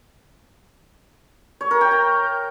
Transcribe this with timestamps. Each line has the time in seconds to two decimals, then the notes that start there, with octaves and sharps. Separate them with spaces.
1.61 C#5
1.71 A#4
1.81 G5
1.91 A#5